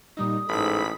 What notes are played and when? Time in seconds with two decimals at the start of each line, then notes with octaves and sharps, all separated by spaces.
0.17 A#2 G3 D#4 D#6
0.49 A1 G#2 A4 B5 B6